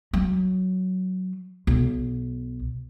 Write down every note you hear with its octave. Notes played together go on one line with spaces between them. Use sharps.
F#3
B1